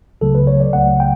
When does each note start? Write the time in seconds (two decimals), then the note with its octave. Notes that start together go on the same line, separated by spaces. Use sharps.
0.21 C#2 C#3 F#3 A3 A4
0.35 B4
0.47 C#5
0.60 D5
0.73 C#2 C#3 F#3 A3 F#5
1.00 G5